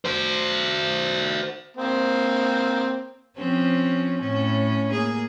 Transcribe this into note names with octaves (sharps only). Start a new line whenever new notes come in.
F#4 C5
A#3 C4
F3 C4 C#4
A2 C#4
A#3 G#4